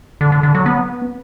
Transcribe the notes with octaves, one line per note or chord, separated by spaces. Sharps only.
D3
D3
D3
F#3
B3